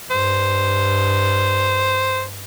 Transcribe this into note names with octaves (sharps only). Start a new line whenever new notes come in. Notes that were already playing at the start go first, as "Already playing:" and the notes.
G2 C5